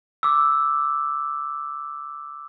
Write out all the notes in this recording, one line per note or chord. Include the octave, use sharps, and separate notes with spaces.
D6 E6